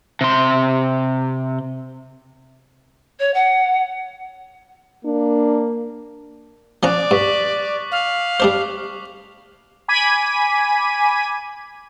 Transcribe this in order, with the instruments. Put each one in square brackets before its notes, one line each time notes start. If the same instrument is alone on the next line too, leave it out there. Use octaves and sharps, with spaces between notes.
[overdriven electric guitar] C3 C6
[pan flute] C#5
F#5
[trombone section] A#3 [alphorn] D4
[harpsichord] F3 C#4 A#5 [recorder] D5 [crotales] D6 D#6 F#6
[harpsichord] G2 [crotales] C#6 B6 F#7
[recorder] F5
[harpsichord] G3 D4 C5 [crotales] D6
[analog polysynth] G#5 B5 D6 G#6 B6 D#7